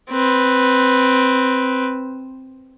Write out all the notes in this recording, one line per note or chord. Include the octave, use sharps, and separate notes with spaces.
C4 B4